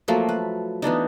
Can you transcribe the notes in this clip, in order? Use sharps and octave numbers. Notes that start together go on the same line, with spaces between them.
F3 F#3 A3 A#3
B4
E3 B3 D4 D#4